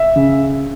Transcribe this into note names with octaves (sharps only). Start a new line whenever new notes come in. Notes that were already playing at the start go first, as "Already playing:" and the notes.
Already playing: E5
C#3